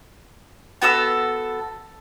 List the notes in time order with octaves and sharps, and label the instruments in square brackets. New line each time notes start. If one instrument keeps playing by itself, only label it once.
[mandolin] B3 F#4 A4 E6